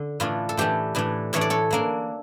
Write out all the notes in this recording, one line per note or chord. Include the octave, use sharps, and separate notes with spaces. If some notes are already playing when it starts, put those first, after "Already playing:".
Already playing: D3
A2 E3 A3 D4 F4
A4
A2 E3 A3 D4 G4
A2 E3 A3 D4
A2 E3 A3 D4 C#5
D5
A4 C#5
E3 A#3 D4